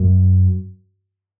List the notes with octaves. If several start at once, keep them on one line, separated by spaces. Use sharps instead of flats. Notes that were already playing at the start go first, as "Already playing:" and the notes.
Already playing: F#2